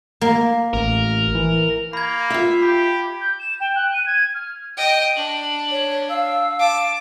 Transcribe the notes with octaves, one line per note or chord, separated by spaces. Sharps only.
A#3
A1 A#4
E3
A#3 B5 G#6
F4 E5
G4 B5
G6
E7
G5
F#6
D#7
G#6
F6
D#5 G5
D4 F#7
C#5
F5 E6
A5 D6